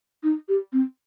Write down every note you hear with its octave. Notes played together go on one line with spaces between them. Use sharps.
D#4
G4
C4